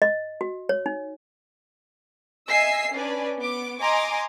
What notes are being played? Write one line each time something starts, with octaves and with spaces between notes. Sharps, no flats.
D#5
F#4
C#5
D#4
D#5 E5 G#5 E6 C7
C#4 D4 B4 D5 G#5
B3 D6
D#5 G#5 A#5 C6 D6